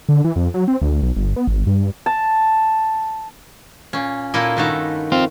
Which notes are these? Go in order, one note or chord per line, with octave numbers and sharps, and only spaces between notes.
D3
E3
F2
F#3
C4
D2
B1
G1
B3
G#1
G2
A5
A#2 C#4
A#2 A#3 E4 F4 A4
G2 D#3 A3 F#4 A5 A#5
C4 F4